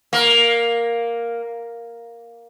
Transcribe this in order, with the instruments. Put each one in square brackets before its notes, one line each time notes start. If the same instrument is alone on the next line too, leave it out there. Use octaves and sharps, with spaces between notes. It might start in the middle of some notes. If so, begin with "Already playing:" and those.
[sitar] A#3